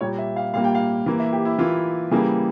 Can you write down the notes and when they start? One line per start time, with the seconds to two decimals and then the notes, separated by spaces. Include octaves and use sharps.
0.01 A#2 G3 A#3 C#5
0.18 E5
0.36 F5
0.54 A#2 G3 A#3 F5
0.64 G5
0.75 F5
1.06 E3 A#3
1.19 E5
1.33 G4
1.45 E4
1.58 E3 A#3 F4
2.11 C#3 E3 G3 A#3 G#4